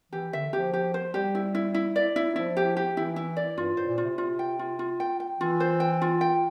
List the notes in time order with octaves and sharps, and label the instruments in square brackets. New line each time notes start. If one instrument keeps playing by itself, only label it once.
[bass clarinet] E3 [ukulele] G4
[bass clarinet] D3 [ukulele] E5
[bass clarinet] F3 [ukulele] G4
[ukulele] G4
C5
[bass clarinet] G3 [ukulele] G4
[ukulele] E4
E4
E4
D5
E4
[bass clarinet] F3 [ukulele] E4
[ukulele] G4
G4
[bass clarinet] E3 [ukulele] E4
[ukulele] E4
D5
[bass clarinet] G2 [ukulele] F4
[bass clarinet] A2 [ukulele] C5
[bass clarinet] A#2
[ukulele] F4
[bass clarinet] C3
[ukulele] F4
G5
F4
F4
G5
G5
[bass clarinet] E3 [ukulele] F4
[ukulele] C5
G5
F4
G5